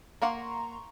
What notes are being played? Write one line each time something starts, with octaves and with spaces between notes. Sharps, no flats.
A#3 F5 F#5 A#5 C6 C#6